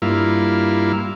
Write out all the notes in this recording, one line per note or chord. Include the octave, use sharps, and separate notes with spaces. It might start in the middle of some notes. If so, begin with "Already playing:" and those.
G2 A#3 E4 F4